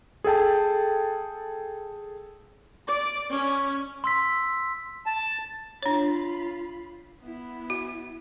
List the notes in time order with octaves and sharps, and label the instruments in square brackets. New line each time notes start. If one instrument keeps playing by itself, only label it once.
[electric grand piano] G#4 A4 G5 A5
[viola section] D5
C#4
[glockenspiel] C6 E6 B6
[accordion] A5
[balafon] D4 C#5 [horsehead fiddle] F4 B5
[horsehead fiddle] B3 E4
[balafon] F#4